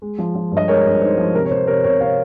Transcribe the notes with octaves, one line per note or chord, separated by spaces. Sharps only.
G#3
F3
F3
G2
D#5
G#3 A#4 C#5
G2
D#4 C5
F3
C3 A#4
C#5
C3 C5
C3 A#4 C#5
C3 A#4 C#5
C3 C#5 F5